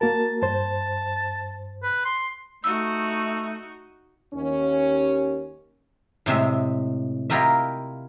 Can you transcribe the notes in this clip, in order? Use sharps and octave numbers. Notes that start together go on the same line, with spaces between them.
A#3 F#4 A#4 A5
G2 C5 A5
B4
C6
A3 D#4 F#4 E6
D#2 C#4
A2 C3 G#3 E5
E4 F4 G4 A#4 D#5 E5